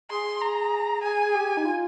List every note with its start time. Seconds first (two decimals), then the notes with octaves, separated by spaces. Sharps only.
0.10 G#4 C6
0.41 G#4 A#5
1.03 G#4 G#5
1.26 G#4
1.35 G4
1.57 D#4
1.65 F4